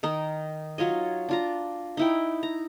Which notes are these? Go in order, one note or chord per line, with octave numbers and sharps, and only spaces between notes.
D#3 D#4 A#4
F#3 F4 C#5 D#5
D4 F4 A#5
D#4 E4 G5
A#5